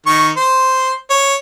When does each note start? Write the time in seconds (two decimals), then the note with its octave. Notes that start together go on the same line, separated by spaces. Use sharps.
0.06 D#3 C#6
0.37 C5
1.10 C#5